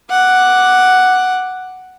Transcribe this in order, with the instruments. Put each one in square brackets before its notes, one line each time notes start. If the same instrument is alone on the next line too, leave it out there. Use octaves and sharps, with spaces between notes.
[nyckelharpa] F#5 D6